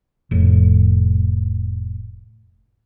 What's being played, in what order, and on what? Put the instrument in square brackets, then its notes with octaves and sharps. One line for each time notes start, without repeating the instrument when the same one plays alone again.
[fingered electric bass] F1 A2